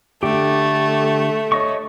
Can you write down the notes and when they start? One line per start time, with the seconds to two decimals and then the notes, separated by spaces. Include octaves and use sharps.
0.23 D3 A3 G4
1.52 C#5 D#5 C#6